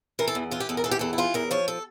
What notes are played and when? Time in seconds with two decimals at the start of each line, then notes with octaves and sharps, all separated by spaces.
0.19 E3 A#4
0.28 A4
0.35 E2
0.51 E3 F4
0.60 G4
0.69 E2 A4
0.77 A#4
0.84 E3 A4
0.91 G4
0.99 E2 A4
1.13 E4
1.18 E3 F4
1.34 E2 A#4
1.51 F3 C#5
1.68 A4